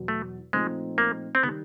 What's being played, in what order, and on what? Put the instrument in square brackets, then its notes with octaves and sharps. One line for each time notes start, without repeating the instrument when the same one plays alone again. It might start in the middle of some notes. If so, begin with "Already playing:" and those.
Already playing: [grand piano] E2 B2 F#3
[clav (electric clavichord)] A3
[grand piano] A#2 F3 A3 C4 D#4 [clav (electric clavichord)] G#3
[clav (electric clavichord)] A#3
C4
[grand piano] D#3 G3 [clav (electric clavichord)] B3